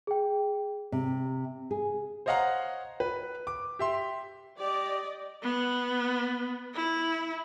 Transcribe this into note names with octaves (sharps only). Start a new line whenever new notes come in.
G#4 G5
C3
G#4
C5 C#5 D#5 F5 F#5 A#5
B4
D6
G4 E5 C6
G4 D5 D#5
B3
E4